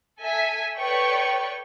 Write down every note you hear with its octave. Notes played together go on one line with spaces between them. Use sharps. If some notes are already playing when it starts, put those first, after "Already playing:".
A4 E5 G#5
A4 B4 C#5 D5 G5 C#6